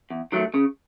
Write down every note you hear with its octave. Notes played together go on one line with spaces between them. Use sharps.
E2
D#3 F#3 A3
C#3